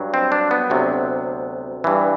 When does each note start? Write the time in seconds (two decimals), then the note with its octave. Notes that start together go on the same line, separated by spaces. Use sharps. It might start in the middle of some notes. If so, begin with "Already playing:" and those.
Already playing: G2 F#3
0.14 C4
0.32 D4
0.51 B3
0.70 D2 C3 F#3
1.84 G2 E3